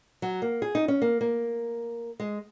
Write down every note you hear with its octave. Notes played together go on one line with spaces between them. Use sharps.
F#3
A#3
G#4
D#4
C#4
A#3
A#3
G#3